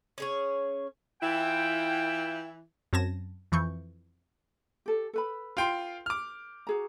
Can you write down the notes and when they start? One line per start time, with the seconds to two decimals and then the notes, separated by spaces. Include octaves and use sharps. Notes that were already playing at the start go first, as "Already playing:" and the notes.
0.18 C#4 G#4 C#5
1.22 E3 E4 F4 G5
2.93 F#2 C4 A5 G#6 A#6 E7
3.52 F2 E3 C#6 G6
4.86 G4 A4
5.14 A4 B4 B5
5.57 F4 G5 C6
6.06 D6 F6
6.67 F#4 G#4 A#5